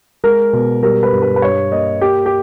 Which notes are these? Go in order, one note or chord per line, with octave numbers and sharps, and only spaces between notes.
G#3 A#4
B2
G3 A#4
B4
G2
B4
B4
G2 C#5
A#3 D#5
A#3 G4
G4